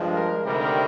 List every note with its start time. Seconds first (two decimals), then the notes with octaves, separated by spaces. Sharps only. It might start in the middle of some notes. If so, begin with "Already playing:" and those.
Already playing: G2 F3 G#3
0.13 A#4
0.44 D2 C3 D#3 G3 A#4